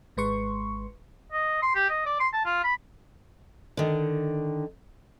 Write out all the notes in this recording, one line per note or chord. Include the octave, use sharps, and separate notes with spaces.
G#1 G#3 B4 C6 C#6
D#5
C6
G4
D#5
D5
C6
A5
F4
B5
D3 D#3